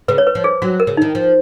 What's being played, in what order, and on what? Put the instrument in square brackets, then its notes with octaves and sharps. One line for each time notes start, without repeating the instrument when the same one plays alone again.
[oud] C#3 [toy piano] B4
[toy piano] C#5
B4
[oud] F3
[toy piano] G#4
[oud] F#3 [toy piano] F#4
[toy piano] A#4
[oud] C#3
[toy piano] D#4
[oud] D#3
F3